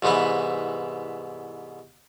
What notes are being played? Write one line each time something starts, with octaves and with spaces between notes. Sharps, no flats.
C2 G#2 E3 B3 E4